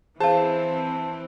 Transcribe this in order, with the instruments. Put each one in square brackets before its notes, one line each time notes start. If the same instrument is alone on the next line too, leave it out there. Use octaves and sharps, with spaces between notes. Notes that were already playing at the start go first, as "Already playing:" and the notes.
[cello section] E3 C4 [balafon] G#4 F5 [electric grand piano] C5 A5